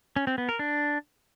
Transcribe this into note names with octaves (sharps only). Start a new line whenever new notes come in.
C#4
C4
B3
A#4
D4